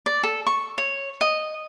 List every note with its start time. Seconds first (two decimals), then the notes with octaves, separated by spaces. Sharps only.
0.06 D5
0.23 A4
0.47 C#6
0.78 C#5
1.21 D#5